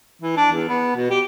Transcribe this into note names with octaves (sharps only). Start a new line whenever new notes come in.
E3
D4
E2
B3
B2
G4